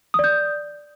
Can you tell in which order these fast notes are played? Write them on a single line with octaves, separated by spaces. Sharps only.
D#6 D5 G6